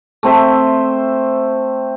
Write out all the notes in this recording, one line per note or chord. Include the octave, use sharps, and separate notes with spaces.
A3 C4 C5 E5